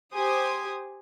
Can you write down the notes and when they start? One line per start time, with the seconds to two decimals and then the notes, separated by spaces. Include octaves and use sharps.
0.12 G4 C5 G#5 D#6